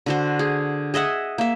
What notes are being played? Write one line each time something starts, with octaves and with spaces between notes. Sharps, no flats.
D3 F#4 C5
G#4
G#4 D#5 E5 F#5
A#3 E5